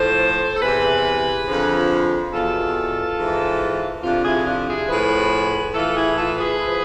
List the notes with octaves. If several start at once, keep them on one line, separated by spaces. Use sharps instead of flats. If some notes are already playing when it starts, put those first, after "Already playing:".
Already playing: A2 F3 A4 C5
A4
E2 C3 E3 G#4 B4
F2 D3 F3
E2 B2 F4 A4
G#2 E3
F2 C3 F3 D4 F4
E4 G#4
D4 F4
E4 G#4
A2 F3 G#4 B4
A2 E3 F4 A4
E4 G#4
F4 A4
G#4 B4
F3